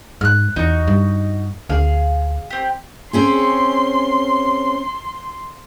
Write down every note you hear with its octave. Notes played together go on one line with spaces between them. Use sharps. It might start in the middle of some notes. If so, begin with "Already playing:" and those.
G#2 F6 F#6
E2 D#4 F#4
G2
D2 G#4 F5
C4 G4
C4 C#4 G#4 C6